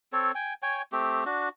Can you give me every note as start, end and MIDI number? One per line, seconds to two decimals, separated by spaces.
0.13 0.32 60
0.13 0.32 69
0.13 0.32 73
0.35 0.54 79
0.35 0.54 80
0.62 0.82 73
0.62 0.82 79
0.62 0.82 80
0.92 1.24 57
0.92 1.24 60
0.92 1.24 67
1.26 1.49 62
1.26 1.49 66